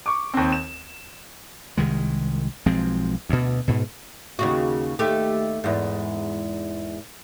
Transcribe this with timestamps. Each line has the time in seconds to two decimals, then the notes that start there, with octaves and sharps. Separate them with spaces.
0.06 C#6 D6
0.34 D#2 C4
0.52 E7
1.77 C2 D#3 G#3
2.66 B1 F3 G#3 C4
3.29 D2 B2
3.68 G#2 B2
4.39 D#2 C#3 F#4
4.99 D#2 A3 G4
5.64 E2 G#2